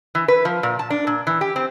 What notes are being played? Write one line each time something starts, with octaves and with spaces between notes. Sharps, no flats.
E3
B4
F3
A#2
A5
D4
A#2
E3
G4
C4